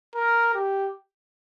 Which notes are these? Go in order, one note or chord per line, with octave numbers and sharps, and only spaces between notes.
A#4
G4